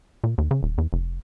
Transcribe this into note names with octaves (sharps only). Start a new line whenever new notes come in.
A#2
D#2
C#3
D#1
E2
F1